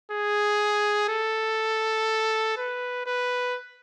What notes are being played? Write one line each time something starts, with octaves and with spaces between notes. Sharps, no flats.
G#4
A4
B4
B4